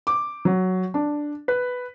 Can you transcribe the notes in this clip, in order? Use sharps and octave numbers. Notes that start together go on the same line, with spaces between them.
D6
F#3
D4
B4